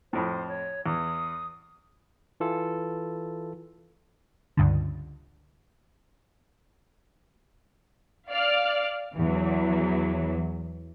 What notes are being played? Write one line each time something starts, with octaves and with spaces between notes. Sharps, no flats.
F2 A2 C5
C#5
E2 D#6
E3 F4 A4
C#2 G2 D3
D5 F5 F6
E2 E3 F#3